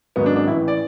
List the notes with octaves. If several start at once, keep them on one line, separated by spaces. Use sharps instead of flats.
G#1 G#2 F#3 B3
D4
D4
A1 A2 E3 E4
D5